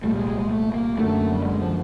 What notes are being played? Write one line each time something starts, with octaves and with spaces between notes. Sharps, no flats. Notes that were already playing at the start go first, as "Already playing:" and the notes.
C2 A#2 G3 A3
G#3
G#3
G#3
A3
A#3
F#2 D3 F#3 A3 A#3
G3
G#3
F3